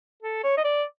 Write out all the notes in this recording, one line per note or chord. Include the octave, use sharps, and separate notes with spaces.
A4
C#5
D#5
D5